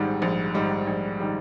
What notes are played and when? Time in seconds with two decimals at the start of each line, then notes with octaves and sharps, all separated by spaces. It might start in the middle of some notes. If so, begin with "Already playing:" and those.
Already playing: A#1 G#2 D#3 G3
0.22 A#1
0.54 G#2 D#3 G3
0.87 A#1
1.20 D#3 G3